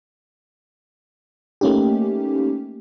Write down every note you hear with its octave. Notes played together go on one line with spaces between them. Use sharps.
A3 A#3 C#4 D#4 G4